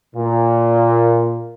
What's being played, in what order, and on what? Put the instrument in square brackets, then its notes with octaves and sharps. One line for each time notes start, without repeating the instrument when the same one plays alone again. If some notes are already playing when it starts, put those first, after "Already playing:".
[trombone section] A#2